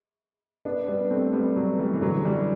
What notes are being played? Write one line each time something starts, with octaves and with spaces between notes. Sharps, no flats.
B3 D4
G3 B3
A3 C4
G3 B3
F#3 A3
E3 G3
E3
D3 F#3
E3 G3